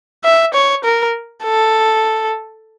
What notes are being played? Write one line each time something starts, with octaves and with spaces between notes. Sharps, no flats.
E5
C#5
A#4
A4